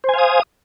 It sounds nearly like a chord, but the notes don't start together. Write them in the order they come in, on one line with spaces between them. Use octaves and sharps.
C5 G#5 F5 D#6